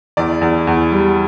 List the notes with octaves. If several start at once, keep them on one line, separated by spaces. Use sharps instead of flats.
E2 D5
E2
E2
G3